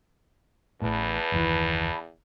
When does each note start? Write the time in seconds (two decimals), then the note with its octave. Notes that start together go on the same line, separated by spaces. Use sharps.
0.82 A1 E2 A2 B4 A5
1.32 F#1 D#2 E3